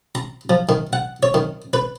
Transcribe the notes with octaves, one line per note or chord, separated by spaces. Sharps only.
A#5
F3
D#3
F#5
C#5
D#3
B4